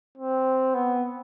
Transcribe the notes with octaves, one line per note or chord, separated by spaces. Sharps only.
C4
B3